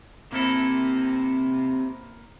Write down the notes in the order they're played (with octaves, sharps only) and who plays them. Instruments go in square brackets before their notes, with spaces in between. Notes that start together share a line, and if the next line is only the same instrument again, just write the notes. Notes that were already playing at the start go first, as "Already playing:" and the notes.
[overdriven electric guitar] C3 C4 [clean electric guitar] A#3 E4 A4